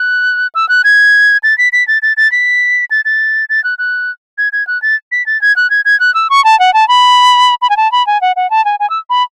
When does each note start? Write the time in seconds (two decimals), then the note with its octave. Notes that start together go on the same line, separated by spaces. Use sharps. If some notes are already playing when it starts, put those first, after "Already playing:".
Already playing: F#6
0.55 E6
0.69 F#6
0.84 G#6
1.43 A6
1.58 B6
1.73 B6
1.88 A6
2.02 A6
2.17 A6
2.32 B6
2.91 A6
3.05 A6
3.49 A6
3.64 F#6
3.79 F#6
4.38 G#6
4.53 G#6
4.67 F#6
4.82 A6
5.12 B6
5.26 A6
5.41 G#6
5.56 F#6
5.70 G#6
5.85 G#6
6.00 F#6
6.14 E6
6.30 C#6
6.45 A5
6.60 F#5
6.74 A5
6.88 B5
7.62 B5
7.70 G#5
7.77 A5
7.92 B5
8.07 G#5
8.21 F#5
8.36 F#5
8.50 A5
8.65 G#5
8.80 G#5
8.90 E6
9.10 B5